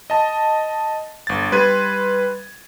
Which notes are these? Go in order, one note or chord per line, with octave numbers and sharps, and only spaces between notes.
D#5 A5
G1 A6
G3 B4 C6 G#6 D#7